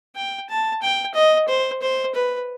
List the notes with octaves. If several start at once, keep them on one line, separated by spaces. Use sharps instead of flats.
G5
A5
G5
D#5
C5
C5
B4